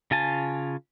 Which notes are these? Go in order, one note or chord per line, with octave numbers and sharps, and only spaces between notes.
C#3 F4 G#5 A5